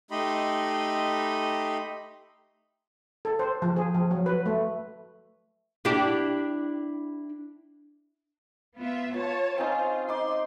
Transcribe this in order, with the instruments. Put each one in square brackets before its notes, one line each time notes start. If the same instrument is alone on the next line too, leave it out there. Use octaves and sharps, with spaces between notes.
[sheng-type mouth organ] A3 D#4 G4 D#5 B5 C6
[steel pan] A4
C5
F3
G#4
F3
F#3
B4
A3
[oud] D4 E4 G4
[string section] B3 F4 E5
[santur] F4 [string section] C#5 A5
[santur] C4 C#4 D#4 [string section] F4
[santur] D#4 D6 [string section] C6